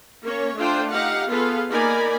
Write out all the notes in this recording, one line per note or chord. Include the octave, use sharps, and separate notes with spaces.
A#3 C#4 C#5
A3 D4 F4 C5 G5
D#4 G4 F5 F#5
B3 F4 G#4 A4 B4 F5
A#3 D#4 A#4 D5 G#5 B5